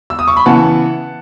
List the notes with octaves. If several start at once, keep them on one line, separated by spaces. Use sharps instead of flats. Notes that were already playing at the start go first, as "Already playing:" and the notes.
E6
D#6
C#6
B5
C#3 E3 B3 F#5 A5